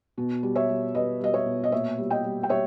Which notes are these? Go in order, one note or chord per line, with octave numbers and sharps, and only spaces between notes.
B2
G3
C#5 E5
G3
G3 B4 D#5
G3 D#5
C#5 E5
B2
D#5
A#2 C#5 E5
G3
D#5 G5
G3
G5
G3 C#5 E5